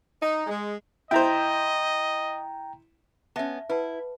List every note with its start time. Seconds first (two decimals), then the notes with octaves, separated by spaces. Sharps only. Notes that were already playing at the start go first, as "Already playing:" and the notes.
0.22 D#4
0.47 G#3
1.11 E4 C5 D#5 G5 A#5
3.36 B3 C#4 E5 F5 A5
3.69 E4 B4 F#5 A5